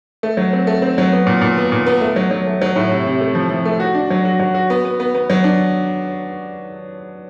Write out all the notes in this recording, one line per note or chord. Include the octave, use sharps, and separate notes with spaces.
A3
F#3
C4
A3
C4
F#3
B3
A#2
A#2
B3
A#2
B3
A3
F#3
F#3
A3
F#3
A2
C3
C3
A3
F3
F3
A3
F#4
D4
F#3
F#4
F#3
F#4
B3
B3
B3
B3
F#3
D4